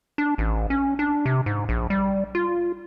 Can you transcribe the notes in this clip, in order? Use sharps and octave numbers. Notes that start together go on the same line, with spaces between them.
D4
A1
C#4
D4
C3
G#2
A#1
G3
F4